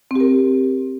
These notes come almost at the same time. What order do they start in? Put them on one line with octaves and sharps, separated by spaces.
C4 G4 A#4